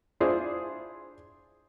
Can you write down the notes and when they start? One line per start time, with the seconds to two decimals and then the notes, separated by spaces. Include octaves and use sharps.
0.20 D4 E4 F4 G#4 C5